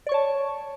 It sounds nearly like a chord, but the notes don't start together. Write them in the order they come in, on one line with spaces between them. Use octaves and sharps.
D5 C#6 C#5 A5